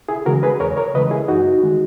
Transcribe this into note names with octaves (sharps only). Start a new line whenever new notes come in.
E4 G#4
C#3 E3 G#3 F#4 A#4
G#4 B4
E2 A#4 C#5
A#4 C#5
C#3 E3 G#3 B4 D#5
E4 G#4
F#2 D#4 F#4
D#3 G#3